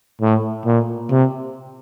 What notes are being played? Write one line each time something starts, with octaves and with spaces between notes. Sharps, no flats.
A2
A#2
C3